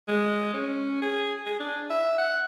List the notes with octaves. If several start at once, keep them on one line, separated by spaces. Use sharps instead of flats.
G#3
C#4
G#4
G#4
D4
E5
F#5